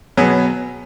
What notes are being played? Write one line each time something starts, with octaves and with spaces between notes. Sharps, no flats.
B2 F#3 B3 G#4